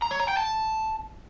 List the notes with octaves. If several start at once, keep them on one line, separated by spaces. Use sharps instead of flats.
A#5
C#5
A#5
G5
A5